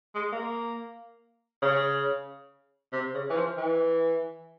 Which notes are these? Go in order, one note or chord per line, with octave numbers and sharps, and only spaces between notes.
G#3
A#3
C#3
C3
C#3
E3
F3
E3